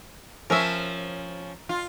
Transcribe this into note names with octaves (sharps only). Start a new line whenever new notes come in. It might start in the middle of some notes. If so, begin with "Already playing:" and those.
F3 C#4 A#4 E5
F4